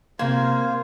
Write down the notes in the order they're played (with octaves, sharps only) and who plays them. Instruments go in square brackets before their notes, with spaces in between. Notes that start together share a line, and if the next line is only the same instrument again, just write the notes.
[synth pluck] C3 G#6 [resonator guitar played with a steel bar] A#3 [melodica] F4 C5